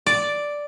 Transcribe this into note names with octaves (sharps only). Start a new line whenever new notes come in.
D5